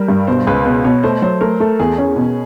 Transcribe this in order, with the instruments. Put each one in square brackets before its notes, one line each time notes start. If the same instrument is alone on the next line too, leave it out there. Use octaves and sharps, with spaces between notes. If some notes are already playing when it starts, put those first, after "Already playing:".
Already playing: [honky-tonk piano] G3 [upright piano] A#4
[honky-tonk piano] G2
[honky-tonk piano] B2 [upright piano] C5
[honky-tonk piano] C#2 [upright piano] B4
[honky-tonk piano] B2 [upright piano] B4
[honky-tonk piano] B2 [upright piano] C#5
[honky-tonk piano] A3 [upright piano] C5
[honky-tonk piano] F#3 [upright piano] C5
[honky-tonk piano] A3 [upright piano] A#4
[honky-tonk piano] A3 [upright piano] A4
[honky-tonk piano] E2 [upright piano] G#4
[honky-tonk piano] C#4
B2